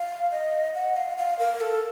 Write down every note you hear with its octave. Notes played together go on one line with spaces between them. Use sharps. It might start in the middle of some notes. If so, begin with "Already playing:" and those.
Already playing: F5
D#5
F#5
F5
F5
A#4
A4